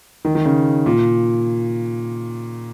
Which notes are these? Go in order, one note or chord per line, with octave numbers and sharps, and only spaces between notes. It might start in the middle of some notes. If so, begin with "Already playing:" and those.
D#3
D#3
C#3
A#2